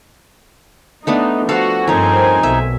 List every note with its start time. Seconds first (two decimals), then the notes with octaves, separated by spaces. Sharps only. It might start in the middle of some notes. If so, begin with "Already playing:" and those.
1.07 A3 B3 D4 D#4
1.49 F3 F#4 A4 F5
1.88 G2 F3 C4 D#4 A#4 C5 C#5 G#5
2.43 B1 E5